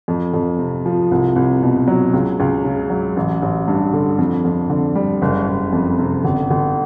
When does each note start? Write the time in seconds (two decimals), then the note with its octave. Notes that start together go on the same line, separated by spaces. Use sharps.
0.08 F2
0.34 F2
0.59 C3
0.86 F3
1.11 C2
1.36 C2
1.63 B2
1.88 F#3
2.14 C#2
2.40 C#2
2.64 C#3
2.90 F#3
3.17 A1
3.42 A1
3.68 G2
3.93 D3
4.19 F2
4.45 F2
4.70 D3
4.95 G3
5.22 F#1
5.48 F#1
5.73 F2
5.99 C3
6.24 G1
6.51 G1